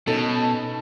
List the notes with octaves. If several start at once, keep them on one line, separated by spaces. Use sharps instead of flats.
B2 C#4 D#4 A4 A5